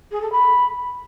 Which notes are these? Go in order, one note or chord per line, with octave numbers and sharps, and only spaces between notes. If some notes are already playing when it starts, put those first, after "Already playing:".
G#4
A4
B5